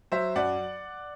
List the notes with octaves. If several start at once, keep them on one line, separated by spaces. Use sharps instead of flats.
F#3 C5 E5
F#2 D5 F#5